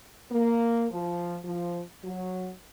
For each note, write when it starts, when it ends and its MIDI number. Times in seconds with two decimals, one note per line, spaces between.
0.32 0.86 58
0.91 1.36 53
1.44 1.81 53
2.04 2.50 54